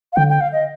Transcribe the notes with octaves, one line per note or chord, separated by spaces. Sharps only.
F5
D3 G5
G5
F5
D#5